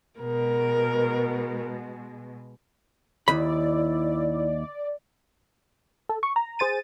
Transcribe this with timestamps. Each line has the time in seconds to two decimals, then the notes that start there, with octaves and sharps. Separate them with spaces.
0.19 B2 G#3 A#4
3.28 D#2 E4 D5 B5
6.09 A4
6.23 C#6
6.36 A#5
6.59 G#4 C5 A6 D#7